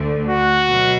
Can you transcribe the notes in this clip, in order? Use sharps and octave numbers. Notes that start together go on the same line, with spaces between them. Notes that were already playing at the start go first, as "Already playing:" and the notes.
Already playing: D2 D3 A3
F#4
B2 F#3